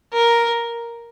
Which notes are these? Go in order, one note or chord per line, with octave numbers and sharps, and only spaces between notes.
A#4